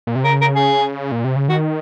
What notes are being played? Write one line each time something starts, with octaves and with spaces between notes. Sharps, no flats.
A#2
C3
C#3 A#4
A#4
G#4
A#2
C3
C#3
D#3 F#4